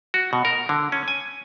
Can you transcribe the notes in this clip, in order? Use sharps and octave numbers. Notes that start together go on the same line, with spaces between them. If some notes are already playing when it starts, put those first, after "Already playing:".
F#4
B2
A#4
D3
C#4
G#5